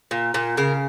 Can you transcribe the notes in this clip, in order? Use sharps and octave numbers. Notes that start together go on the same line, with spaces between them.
A#2
A#2
C#3 A#4